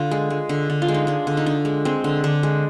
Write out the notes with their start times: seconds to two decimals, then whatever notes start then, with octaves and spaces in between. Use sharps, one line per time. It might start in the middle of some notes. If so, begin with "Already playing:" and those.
Already playing: D3 F4
0.11 G#3
0.30 G#3
0.49 D3
0.70 D3
0.82 F4
0.88 G#3
0.94 D#4
1.07 G#3 D4
1.27 D3
1.37 D#4
1.46 D3 D4
1.65 G#3
1.85 G#3 C4
2.04 D3
2.24 D3 D4
2.43 G#3